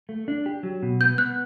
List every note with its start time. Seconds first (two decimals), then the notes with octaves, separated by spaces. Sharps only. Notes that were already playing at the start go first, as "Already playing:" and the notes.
0.09 A3
0.28 D4
0.46 G4
0.63 F#3
0.83 B2
1.01 B3 G6
1.18 B3 F#6